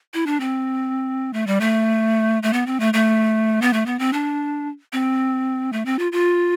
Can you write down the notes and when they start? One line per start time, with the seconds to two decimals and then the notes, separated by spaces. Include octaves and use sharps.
0.14 E4
0.27 D4
0.40 C4
1.33 A3
1.47 G3
1.61 A3
2.43 A3
2.53 B3
2.66 C4
2.80 A3
2.94 A3
3.62 B3
3.73 A3
3.86 B3
3.99 C4
4.13 D4
4.93 C4
5.73 A3
5.86 C4
5.99 F4
6.12 F4